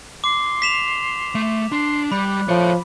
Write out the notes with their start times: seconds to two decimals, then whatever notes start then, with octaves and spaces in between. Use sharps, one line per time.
0.24 C6 D6
0.62 B6 E7 F7
1.35 A3
1.72 D4 C6
2.12 G3 B5 F#6
2.49 F3 A4 C#5